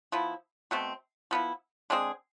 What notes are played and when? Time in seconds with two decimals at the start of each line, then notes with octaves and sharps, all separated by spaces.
0.12 F3 B3 E4
0.71 B2 A3 C4
1.31 F3 B3 E4
1.90 D3 G#3 C4 G#4